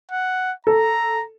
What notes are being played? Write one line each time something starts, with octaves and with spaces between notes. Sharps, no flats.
F#5
A4 A#5